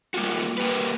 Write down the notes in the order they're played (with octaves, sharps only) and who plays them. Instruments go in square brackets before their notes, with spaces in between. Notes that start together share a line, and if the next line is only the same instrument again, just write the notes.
[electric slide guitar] G3 A#3 C#4 F4 F#4
A#3 G4 B4